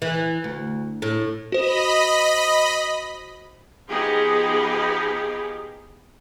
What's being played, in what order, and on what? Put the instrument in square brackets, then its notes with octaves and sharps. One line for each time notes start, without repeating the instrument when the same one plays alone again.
[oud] E3
D2
A2
[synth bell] F#4 C5 [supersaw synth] D#5 B5
[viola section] F3 B3 D#4 G4 G#4